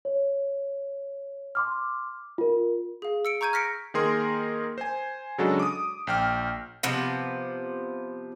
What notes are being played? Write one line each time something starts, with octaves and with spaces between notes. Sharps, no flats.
C#5
C6 D6 F6
F4 A#4
G#4 F5
E6 C#7 D7
A#5 C#6 G6 G#6 D#7
F6 A#6 B6 C#7 D7
D#3 A#3 G#4 A#4 C6
C5 G#5
C#3 F#3 G#3 D4 F#4 A4
D6 D#6
A#1 G5 F6
C3 F3 B3